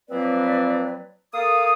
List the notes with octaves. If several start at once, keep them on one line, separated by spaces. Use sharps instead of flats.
F3 F#3 A#3 C4 B4 D5
A#3 A4 F5 D#6